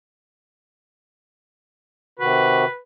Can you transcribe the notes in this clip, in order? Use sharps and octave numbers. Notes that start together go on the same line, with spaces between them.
C3 D#3 F#4 B4